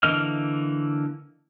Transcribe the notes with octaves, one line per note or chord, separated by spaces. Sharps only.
D3 E3 A#3 D#5 F6